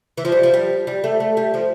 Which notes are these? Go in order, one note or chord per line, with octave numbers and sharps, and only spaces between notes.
E3
F3
G3
F3
G3
G3
A3
A3
G3
F3